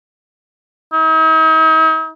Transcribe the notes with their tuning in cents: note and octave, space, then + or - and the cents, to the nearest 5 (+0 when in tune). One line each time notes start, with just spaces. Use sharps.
D#4 +45